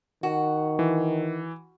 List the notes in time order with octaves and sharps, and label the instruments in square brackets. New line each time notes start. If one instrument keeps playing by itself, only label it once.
[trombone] D#3 [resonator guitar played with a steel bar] F#4
[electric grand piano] E3